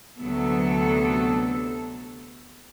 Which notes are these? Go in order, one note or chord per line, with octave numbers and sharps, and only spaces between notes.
D2 C3 F#3 B3 A4